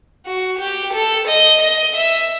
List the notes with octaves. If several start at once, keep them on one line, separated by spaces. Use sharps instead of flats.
F#4
G4
A4
D#5
D#5
E5